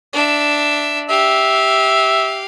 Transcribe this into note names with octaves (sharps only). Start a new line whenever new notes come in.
D4 E5
G4 E5 F5